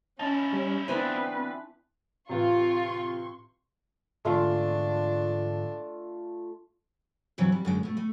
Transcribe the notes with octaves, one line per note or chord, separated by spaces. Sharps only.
C#4 D#4 E4 A5
G3
E3 B3 C4 D4 B4 C5
A2 C3 E3 F4 B4 C6 C#6
G#2 D3 E3 A3 D4 F4 F5
G2 C3 E3 F#3
G3
F#2 D3 G#3
B2 A3
A3